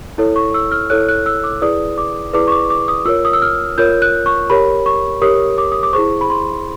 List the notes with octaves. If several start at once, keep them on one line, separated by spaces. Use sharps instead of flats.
E4 A4 C#5
C#6
E6
F6
E4 A4 C#5 F#6
F#6
E6
D6
E4 G#4 B4 D5 D#6
D6
E4 G#4 B4 D5 D6
C#6
D6
D6
D#6
F4 A#4 C#5 E6
D#6
E6
F6
F4 A#4 C#5 G6
F#6
C#6
G4 A#4 C#5 B5
C#6
G4 A#4 C#5 D#6
D6
D#6
D6
E4 G#4 C5 C#6
B5
C6